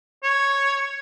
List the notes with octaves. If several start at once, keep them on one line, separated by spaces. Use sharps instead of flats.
C#5